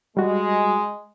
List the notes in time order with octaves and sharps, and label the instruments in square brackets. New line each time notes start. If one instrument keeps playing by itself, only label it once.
[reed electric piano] G3 F#4 [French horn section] G#3